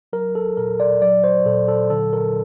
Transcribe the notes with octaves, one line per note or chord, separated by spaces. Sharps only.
F#3 A#4
A4
A#2 A#4
D5
F#3 D5
C5
A#2 A4
A4
D3 A4
A#4